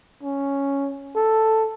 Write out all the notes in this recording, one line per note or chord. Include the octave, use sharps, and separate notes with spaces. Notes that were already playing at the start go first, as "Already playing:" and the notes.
C#4
A4